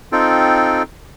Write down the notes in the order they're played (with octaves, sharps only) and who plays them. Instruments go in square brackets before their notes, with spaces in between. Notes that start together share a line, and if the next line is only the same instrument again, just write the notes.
[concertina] C4 D#4 F4 A4 G5